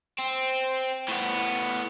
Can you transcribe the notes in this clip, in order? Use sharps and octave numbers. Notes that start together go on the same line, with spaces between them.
C4
A2 B3